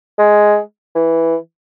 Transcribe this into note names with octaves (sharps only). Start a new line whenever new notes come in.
G#3
E3